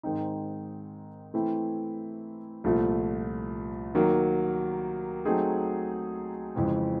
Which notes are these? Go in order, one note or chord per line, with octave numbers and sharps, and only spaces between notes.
G#2 D#3 G#3 C4 D#4
E3 A3 C4 E4
C2 A#2 F3 A3
D#3 F#3 A#3
F#3 A3 C4 D#4 G#4
F2 C#3 E3 G#3 C4